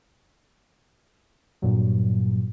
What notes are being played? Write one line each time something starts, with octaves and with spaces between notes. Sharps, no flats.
G2 A#2 F#3